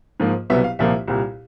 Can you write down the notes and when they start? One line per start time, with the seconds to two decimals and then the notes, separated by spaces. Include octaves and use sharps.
0.20 G#2 F3 A#3
0.50 C2 B2 F#3 B3 E5
0.64 F5
0.79 C2 A#2 F3 A#3 E5
1.08 C2 A#2 G3